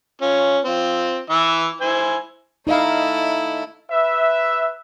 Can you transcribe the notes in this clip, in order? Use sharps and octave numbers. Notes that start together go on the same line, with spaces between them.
C#4 F4
C4 F4
E3 E5
E4 C5 G#5
A3 D#4 E4 D#5 F5
B4 E5